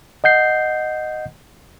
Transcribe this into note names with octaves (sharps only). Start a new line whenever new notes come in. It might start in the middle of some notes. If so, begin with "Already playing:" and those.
D#5 F#5 G6 C7